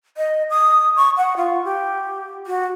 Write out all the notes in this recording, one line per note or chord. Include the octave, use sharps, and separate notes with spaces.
D#5
D#6
C#6
F#5
F4
G4
F#4